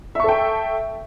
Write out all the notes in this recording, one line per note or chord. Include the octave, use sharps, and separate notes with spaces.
A4 E5 G5 C#6